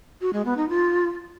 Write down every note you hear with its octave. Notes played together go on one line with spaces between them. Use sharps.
F#4
G#3
B3
D#4
F4